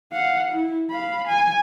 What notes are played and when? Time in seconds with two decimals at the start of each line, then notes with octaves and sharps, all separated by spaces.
0.13 F5 F#5
0.52 E4
0.90 F5 B5
1.27 G#5